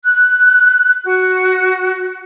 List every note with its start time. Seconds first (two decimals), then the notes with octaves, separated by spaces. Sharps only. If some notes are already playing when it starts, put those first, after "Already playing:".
0.04 F#6
1.04 F#4